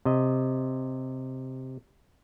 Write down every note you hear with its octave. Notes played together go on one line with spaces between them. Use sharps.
C3 D#5